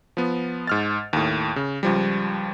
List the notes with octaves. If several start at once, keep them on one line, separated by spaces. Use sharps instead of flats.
F3 B3
G#2 F6 A6
D#2 A2
C#3
C#2 F3 G3